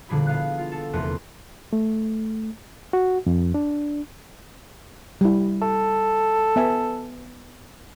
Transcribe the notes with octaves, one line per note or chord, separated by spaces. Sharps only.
E1 A#2 D3 G3 G#4 B5
B3 F5 F#6
F4
A4
F1 E2 A3 A#4 B4 C6
A3
F#4
F2
D4
G3 E4
A4
B3 E5 G#5